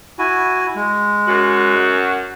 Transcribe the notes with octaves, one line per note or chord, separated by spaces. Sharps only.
E4 F#4 G#5
G#3
F#2 F#4